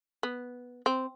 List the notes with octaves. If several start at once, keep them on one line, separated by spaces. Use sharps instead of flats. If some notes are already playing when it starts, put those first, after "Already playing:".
B3
C4